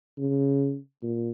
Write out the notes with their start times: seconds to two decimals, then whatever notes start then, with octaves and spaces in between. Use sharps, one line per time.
0.18 C#3
1.03 A#2